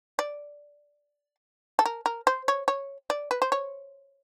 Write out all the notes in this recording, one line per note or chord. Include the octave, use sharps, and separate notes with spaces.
D5
A4
A#4
A#4
C5
C#5
C#5
D5
B4
C5
C#5